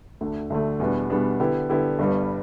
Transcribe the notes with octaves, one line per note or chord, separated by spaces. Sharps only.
D2 D3 A3
D2 D3 A3
E2 B2 G3 B3 D4
E2 B2 G3 B3 D4
D3 B3 E4 G4
D3 B3 E4 G4
G1 G2 G3 B3